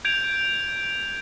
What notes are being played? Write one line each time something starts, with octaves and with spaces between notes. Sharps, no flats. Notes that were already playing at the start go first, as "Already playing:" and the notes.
G6 G#6 D7 F7